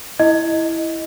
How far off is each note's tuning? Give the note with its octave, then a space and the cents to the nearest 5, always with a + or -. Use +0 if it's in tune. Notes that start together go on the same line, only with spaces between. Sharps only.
E4 +0 D#5 +10